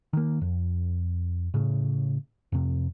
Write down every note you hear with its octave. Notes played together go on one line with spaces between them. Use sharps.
D#3 A#3
F2
A2 C#3
F2 C3